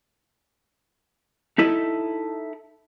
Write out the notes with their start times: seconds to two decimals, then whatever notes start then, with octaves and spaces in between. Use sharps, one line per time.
1.58 D#4 E4 A4 D#5